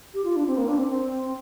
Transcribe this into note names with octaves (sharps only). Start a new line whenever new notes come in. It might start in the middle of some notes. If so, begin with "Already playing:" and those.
G4
F4
D4
C4
A#3
D4
C4
C4